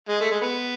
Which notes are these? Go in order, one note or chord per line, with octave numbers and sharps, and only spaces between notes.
G#3
A3
G#3
B3